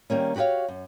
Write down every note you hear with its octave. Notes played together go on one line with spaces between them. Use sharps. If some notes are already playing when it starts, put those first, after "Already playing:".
D#3 G3 A#3 C#4
F#4 G4 A#4 C#5 F5
F#2